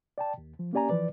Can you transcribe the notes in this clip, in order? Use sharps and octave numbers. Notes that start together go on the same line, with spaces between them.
D5 G5 A5
D#2
F3
A#3 C#4 G4 D5 G#5 A#5
E3 F3 B4 D5